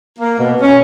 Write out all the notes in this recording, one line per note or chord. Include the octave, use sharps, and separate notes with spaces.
A#3
B2
C#4